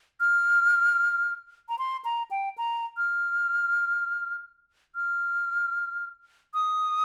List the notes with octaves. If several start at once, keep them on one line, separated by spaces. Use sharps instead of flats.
F6
A#5
C6
A#5
G5
A#5
F6
F6
D#6